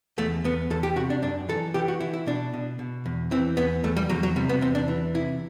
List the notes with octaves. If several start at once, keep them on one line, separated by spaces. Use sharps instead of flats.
E2 A3
E2 B3
E2 A4
G4
C3 F#4
D4
F#2 D4
E3 A4
E3 G4
F#4
E3 E4
E4
B2 D4
B2
B2
E2
E3 C4
E2 B3
E2 A3
G3
E2 F#3
F#3
C3 G3
B3
E2 C4
D4
E3
C3 E4